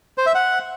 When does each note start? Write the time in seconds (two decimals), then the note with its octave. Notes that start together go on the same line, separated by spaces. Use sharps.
0.18 C5
0.26 E5
0.35 F#5